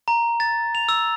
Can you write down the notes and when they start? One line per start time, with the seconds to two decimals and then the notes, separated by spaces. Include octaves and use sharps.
0.08 A#5
0.40 A6
0.75 F7
0.89 E6